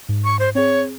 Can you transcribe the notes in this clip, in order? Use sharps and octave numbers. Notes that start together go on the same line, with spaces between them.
G#2
C#6
C5
C4 G#4 C#5